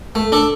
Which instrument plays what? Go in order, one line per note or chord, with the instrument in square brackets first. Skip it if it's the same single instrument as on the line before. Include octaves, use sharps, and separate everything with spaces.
[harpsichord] A3
D4 A4